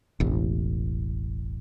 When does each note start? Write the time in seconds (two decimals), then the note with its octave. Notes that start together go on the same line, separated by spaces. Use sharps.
0.20 E1 A1